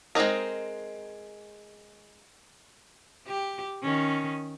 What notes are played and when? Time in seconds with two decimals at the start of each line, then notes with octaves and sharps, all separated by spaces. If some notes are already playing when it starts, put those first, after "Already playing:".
0.15 G#3 C4 D4 D#4 A#4
3.27 G4
3.83 D#3 C#4